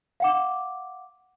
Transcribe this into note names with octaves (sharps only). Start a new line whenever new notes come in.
F5 F#5 D6